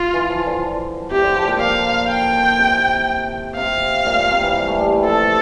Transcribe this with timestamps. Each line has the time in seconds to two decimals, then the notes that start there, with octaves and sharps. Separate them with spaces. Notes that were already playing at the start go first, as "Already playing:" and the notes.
Already playing: F4
0.14 E3
0.30 F3
0.46 D3
1.11 C3 G4
1.23 D3
1.36 F3
1.48 A#2
1.60 A#2 F5
2.09 G5
2.59 C3
3.57 C3 F5
4.06 A#2
4.19 A#2
4.31 C3
4.43 E3
4.55 G3
4.67 A3
4.78 G3
5.03 F3 A4